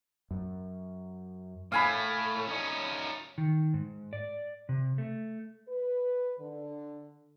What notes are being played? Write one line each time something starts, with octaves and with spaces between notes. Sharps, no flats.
F#2
A2 A3 F5 G#5 B5
C#4 D#4
D#3
G#2
D5
C3
A3
B4
D3